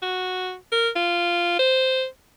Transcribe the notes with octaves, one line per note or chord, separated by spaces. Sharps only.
F#4
A#4
F4
C5